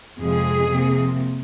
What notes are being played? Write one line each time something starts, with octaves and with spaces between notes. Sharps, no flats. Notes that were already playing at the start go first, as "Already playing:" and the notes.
F2 C3 F3 G#3 G#4
C3 F3 A#3